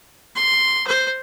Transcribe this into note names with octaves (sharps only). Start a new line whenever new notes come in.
C6
C5